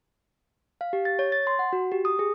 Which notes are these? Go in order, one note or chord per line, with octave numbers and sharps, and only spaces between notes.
F5
G4
A6
C#5
A6
C6
F#5
F#4
G4
D#6
G#4